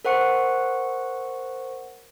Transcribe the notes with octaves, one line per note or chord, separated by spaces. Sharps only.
A#4 C5 F#5 C#6 C#7